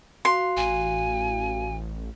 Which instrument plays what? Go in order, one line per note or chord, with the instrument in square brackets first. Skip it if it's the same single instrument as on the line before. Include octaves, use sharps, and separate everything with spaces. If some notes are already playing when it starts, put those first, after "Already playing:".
[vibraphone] F#4 F5 [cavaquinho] C6
[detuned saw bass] A1 [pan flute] G#5